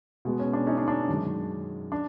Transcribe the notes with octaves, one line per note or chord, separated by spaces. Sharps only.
B2 G#3 B3
C#4
D4
C#4 D#4
D4
D4
F#2 D#3 G#3
D4